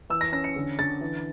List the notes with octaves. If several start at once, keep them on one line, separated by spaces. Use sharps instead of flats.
E3 E6
A#6
C#4 A#6
C#7
D3
D3 A6
E3